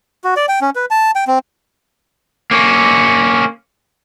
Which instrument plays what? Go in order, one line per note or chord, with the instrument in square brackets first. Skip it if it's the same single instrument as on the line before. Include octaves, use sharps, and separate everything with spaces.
[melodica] F#4
D5
G5
C#4
B4
A5
G5
C4
[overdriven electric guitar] A#3 C#4